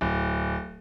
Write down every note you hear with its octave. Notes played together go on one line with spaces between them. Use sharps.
D1